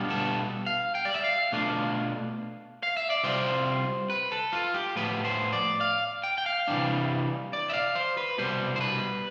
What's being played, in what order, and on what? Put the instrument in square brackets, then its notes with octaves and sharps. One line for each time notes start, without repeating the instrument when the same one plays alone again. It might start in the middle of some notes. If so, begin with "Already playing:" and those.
Already playing: [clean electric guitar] B2 G3 B3 D4 F4
A4
F5
G5
D5
E5
F5
B2 A3 D4 F4
F5
E5
D5
C3 G3 C4 F4 C5
B4
A4
F4
G4
A2 F3 B3 B4
C5
D5
F5
G5
G5
F5
C3 E3 G3 D4
D5
E5
F5
C5
B4
C2 B2 G3 C5
C5
B4